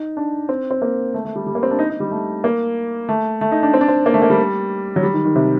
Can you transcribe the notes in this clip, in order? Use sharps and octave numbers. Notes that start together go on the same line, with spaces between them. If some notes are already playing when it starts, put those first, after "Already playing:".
Already playing: D#4
D4
C4
C4
A#3
A3
A3
G3
G3
A#3
C4
D4
D#4
D#4
G3
A3
A#3
A3
A3
D#4
D4
C4
D4
C4
A#3
A3
A#3
G3
F#3
G3
D#3
D#3
C3